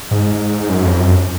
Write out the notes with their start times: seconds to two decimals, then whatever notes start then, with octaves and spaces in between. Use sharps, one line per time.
0.11 G#2
0.69 F#2
0.85 F2
1.00 F#2